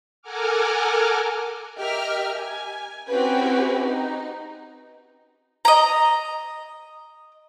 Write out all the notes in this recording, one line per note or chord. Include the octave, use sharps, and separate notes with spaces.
A4 A#4 F#5 G#5 D6 F6
G4 A#4 D#5 E5 F6
G#5
C4 C#4 E4 F#4 G4 B4
D#4
D#5 A#5